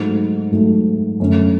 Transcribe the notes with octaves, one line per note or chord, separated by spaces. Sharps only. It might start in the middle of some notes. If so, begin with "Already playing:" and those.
Already playing: G#2 F#3 A3
G#2 F#3 A3
F#2 D3 A3 C#4